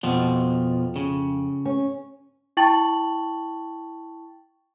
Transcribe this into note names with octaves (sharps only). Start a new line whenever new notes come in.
F2 B2 F3
C#3
C#4
E4 G5 A5 C#6 A6 F#7